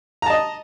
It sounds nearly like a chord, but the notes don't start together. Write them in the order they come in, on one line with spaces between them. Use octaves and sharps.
A#5 A5 D#5